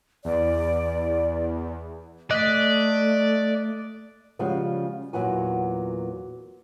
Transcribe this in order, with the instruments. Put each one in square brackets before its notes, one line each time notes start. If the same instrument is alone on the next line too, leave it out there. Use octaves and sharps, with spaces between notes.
[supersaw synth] E2 [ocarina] D5
[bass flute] A3 [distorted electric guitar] D5 [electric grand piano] D#5 [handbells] F#6 B6
[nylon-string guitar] C#3 F3 G3 G#3 C#4 F#4
E2 A#2 F#3 B3 F#4 G#5